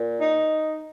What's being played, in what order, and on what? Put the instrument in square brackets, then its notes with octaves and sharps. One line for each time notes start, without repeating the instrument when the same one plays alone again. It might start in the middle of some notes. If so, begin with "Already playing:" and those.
Already playing: [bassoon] A#2
[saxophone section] D#4